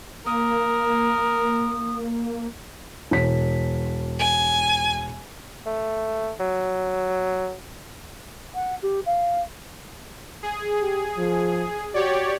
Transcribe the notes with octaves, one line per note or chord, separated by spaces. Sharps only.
A#3 A#4 D#6
E1 B6
G#5
A3
F#3
F#5
G4
F5
G#4
G4
F3
F#4 G4 C#5 D5